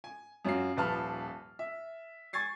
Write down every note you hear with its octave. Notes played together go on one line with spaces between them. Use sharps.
G#5
F#2 C#4 F4 F#4 C7
D#1 F3 B4 A5 F6
E5
G#5 C#6 G#6 A6 C7